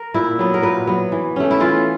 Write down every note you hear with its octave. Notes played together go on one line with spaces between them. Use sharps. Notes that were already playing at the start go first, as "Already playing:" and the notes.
Already playing: A#4
A#2 E4
F#3 B3
A#4
A#2 B4
F#3 B3
E3
A3 C#4
E4
E3 F4